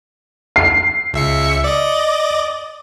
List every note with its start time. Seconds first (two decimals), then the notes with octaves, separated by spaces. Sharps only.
0.56 C7
1.13 C#2 E5 C#7
1.64 D5 D#5